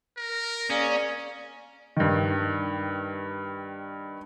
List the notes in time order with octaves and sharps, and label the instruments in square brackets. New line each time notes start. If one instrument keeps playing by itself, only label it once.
[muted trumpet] A#4
[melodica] A#3 G#4 [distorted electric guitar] C#4 [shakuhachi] D5
[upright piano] G2 D#3